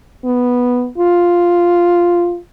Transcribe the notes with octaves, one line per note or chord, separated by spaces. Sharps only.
B3
F4